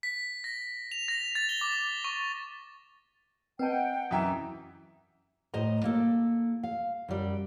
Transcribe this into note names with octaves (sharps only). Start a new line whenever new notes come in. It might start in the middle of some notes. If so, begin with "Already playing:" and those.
B6
A#6
F7
A#6
A6
G7
D6
C#6
C4 B4 D#5 F#5 G5 A5
F#2 E3 E5 A#5 D#6
A2 C5 D#5 A#5
A#3 A4
F5
F#2 G3